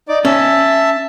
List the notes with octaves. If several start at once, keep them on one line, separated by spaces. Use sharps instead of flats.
D#4 D5 D6
C#4 E5 A5